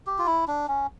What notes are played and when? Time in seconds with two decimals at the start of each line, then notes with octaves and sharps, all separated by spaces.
0.07 G4
0.19 F4
0.26 E4
0.48 D4
0.68 C#4